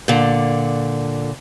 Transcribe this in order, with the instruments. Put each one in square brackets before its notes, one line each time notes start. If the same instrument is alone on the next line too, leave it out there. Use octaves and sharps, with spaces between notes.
[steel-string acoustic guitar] A#2 D3